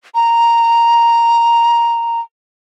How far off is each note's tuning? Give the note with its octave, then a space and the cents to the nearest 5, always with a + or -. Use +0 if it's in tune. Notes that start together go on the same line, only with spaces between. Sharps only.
A#5 +0